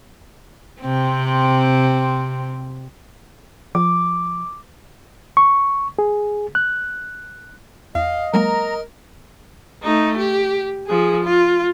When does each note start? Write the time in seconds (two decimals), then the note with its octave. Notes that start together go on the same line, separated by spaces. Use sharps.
0.80 C3 C4
3.75 F3 D6
5.37 C#6
5.99 G#4
6.55 F#6
7.95 E2 D#5 F5
8.34 F#3 G#3 A#3 A#4 A#5
9.83 A3 D#4
10.18 G4
10.87 F3 G#4
11.25 F4